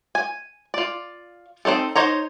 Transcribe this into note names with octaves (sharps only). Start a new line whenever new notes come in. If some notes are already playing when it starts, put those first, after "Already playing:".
G#5
F4 D5
C4 C#4 D#4 A4
D#4 C5 C#5 A#5